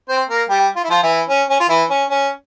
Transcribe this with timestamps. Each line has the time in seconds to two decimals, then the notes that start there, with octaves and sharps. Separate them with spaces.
0.09 C4 C5
0.29 A#3 A#4
0.49 G3 G4
0.76 F4
0.84 E4
0.90 F3 F4
1.03 E3 E4
1.29 C#4
1.50 C#4
1.60 F4
1.69 E3 E4
1.90 C#4
2.11 C#4